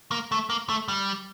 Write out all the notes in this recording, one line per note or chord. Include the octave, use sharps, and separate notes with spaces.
A#3
A3
A#3
A3
G3